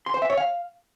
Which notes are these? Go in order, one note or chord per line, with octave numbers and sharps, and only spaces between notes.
C6
C5
E5
C#5
F5